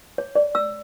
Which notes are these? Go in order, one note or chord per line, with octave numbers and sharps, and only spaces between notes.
C#5
D5
E6